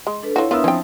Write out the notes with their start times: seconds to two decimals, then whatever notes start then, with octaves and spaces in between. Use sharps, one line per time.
0.07 G#3
0.23 D4 A4 B4
0.36 F3 E4 F#4 C#5
0.51 B3 D4 F4 A#4 E5 D#6 E6
0.64 F3 C4 C#4 E4 G5